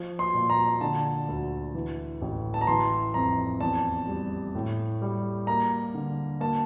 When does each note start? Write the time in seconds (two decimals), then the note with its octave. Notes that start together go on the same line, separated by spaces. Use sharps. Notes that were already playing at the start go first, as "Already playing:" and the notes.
Already playing: F3
0.19 C6
0.34 A#2
0.50 A#5
0.81 D3 A5
1.28 D2
1.74 E3
2.22 A1
2.54 A5
2.61 A#5
2.67 E3 C6
3.14 F2 A#5
3.61 E2 A5
4.07 G3
4.55 A2
5.02 G3
5.47 A#3 A#5
5.95 D3
6.41 A#3 A5